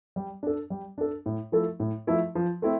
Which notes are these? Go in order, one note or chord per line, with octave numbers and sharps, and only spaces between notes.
G3
D4 A4
G3
D4 A4
A2
F3 A3 E4 A4
A2
F3 A3 E4 A4
F3
A3 C4 E4